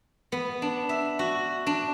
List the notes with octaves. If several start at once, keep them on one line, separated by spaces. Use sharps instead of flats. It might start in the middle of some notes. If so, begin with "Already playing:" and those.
B3
D4
E5
F#4
D4